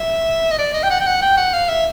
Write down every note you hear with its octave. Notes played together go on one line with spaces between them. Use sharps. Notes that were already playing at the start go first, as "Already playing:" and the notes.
Already playing: E5
D#5
D5
D#5
G5
F#5
G5
F#5
G5
F#5
F5
E5